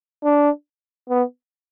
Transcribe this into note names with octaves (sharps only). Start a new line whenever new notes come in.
D4
B3